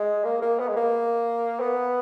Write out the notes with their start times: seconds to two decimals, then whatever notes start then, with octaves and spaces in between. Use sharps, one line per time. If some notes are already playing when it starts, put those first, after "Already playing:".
Already playing: G#3
0.24 A#3
0.42 A#3
0.59 B3
0.69 G#3
0.76 A#3
1.60 B3